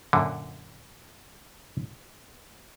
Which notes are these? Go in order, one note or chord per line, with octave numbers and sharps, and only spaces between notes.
F#2 A#2 D3